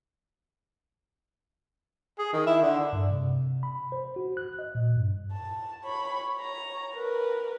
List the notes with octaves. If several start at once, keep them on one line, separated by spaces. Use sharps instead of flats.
G#4
D#3
E4
D3
G2
C3
B5
C5
F#4
F#6
D#5
A#2
G2
A5
C#5 B5
C#5 A#5
A#4 B4